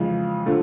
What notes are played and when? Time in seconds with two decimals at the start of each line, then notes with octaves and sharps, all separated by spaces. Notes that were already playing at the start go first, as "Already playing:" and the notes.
Already playing: F2 C#3 E3 G#3
0.46 D3 F3 A3